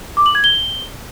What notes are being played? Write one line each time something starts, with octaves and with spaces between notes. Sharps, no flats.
D6
F#7
G#6
G7